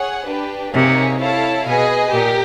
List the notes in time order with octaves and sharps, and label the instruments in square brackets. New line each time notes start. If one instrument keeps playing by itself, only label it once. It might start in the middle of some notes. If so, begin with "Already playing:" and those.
Already playing: [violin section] G#4 C#5 F#5
D4 G4 B4
[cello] C3 [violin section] A#3 D#4 G#4 C#5
[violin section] E4 A4 C#5 F5 A5
[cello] B2 [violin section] G#4 B4 D#5 G#5
[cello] A#2 [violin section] G4 A#4